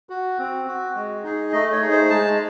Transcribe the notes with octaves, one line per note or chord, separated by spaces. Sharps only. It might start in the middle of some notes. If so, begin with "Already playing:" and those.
F#4
C4
F#4
G#3
D#4 G#4
A3 D#5
C#5
D#4 G#4
C5
G#3 A5